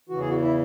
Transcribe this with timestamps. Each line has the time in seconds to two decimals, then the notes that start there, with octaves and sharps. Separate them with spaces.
0.09 E2 C#3 E3 F#4
0.20 G#4
0.29 F#4
0.42 E4